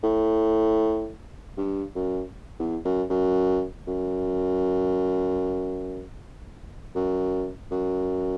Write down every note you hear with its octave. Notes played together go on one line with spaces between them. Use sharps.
A2
G2
F#2
E2
F#2
F#2
F#2
F#2
F#2